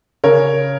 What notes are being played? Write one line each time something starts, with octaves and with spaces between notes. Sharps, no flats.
C#3 A#4 C#5